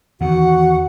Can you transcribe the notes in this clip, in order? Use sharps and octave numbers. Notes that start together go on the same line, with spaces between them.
E2 D#3 F#4 F#5